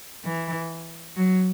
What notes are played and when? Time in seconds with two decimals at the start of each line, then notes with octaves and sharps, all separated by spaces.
0.24 E3
1.16 F#3